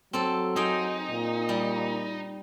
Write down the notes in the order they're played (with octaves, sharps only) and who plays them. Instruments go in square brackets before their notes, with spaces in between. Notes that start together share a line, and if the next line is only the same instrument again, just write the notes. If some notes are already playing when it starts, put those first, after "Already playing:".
[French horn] F#3 [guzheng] C4 A4
[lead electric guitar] D#4 [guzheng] G#4 C5 G5
[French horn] A#2
[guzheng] G3